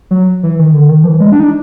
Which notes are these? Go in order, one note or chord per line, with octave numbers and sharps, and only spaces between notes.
F#3
E3
D#3
D3
D#3
F3
E3
G#3
D4
D#4
D4